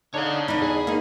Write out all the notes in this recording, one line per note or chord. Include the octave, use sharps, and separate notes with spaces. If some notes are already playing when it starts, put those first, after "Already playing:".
D3 D4 D#4 C#5 F5
E2 D4 D#4 B5
G#4
A#3 D#4